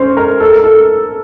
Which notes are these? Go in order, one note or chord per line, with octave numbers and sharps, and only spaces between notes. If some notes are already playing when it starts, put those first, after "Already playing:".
Already playing: C#4 C5
A#4
A4
A#4
A4